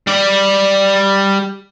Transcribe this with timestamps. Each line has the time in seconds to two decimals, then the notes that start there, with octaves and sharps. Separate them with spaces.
0.07 G3 D5